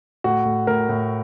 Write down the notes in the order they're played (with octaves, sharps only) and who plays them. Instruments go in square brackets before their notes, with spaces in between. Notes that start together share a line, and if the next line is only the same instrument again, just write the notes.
[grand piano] A2 F#4
A2
A2 A#4
A2